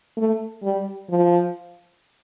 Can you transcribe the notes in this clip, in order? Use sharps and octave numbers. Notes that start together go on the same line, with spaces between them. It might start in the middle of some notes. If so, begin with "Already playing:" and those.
A3
G3
F3